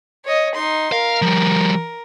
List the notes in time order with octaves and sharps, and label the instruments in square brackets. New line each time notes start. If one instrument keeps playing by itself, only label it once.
[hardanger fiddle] C#5 D#5
D#4 C6
[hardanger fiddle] A#4 [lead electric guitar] F5
[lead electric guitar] F3 G3